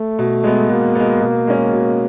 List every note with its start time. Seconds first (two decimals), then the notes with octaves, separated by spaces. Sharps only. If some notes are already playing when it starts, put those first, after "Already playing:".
Already playing: A3
0.19 B2
0.44 G#3 B3
0.69 B2 A#3
0.95 G#3 B3
1.21 B2
1.47 G#3 C#4
1.73 B2